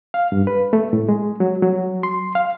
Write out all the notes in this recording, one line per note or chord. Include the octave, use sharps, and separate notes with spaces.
F5
G2
B4
A3
A2
G#3
F#3
F#3
C6
F5